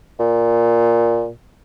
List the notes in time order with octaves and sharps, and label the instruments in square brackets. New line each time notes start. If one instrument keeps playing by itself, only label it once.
[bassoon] A#2